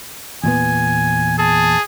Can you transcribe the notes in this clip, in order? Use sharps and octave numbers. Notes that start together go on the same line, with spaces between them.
E2 A#2 B3 G#5
G#4 A5